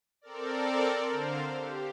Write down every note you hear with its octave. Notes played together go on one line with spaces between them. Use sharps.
C4 A4 A#4 D5
D3 C5 F5
G4